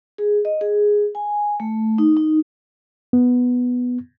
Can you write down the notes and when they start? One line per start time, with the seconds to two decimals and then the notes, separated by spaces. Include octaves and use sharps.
0.18 G#4
0.45 D#5
0.61 G#4
1.15 G#5
1.60 A3
1.98 D#4
2.17 D#4
3.13 B3